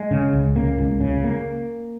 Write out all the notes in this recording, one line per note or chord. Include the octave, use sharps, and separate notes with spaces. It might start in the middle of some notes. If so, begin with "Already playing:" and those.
Already playing: G#3
C#3
C#2
C#3 A#3
C#2
C#3
A#3